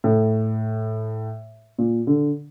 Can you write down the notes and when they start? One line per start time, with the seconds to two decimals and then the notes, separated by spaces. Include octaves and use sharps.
0.04 A2
1.78 A#2
2.07 D3